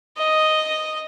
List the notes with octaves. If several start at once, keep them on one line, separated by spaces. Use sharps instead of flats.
D#5